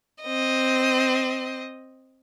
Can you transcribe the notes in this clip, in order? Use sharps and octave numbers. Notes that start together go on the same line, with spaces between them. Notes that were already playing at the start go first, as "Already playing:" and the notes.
C4 D#5